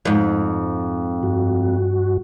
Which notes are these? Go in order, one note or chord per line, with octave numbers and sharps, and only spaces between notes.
F2 G#2
G2 F#4